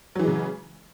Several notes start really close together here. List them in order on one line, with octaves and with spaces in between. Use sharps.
F#3 E3 G#3 C#3